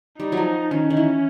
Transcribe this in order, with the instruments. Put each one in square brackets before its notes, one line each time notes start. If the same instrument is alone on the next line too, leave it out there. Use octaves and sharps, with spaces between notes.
[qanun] G3 [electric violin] D#4
[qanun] F#3
F3
[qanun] D#3 [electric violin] C#4
[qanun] D#3
E3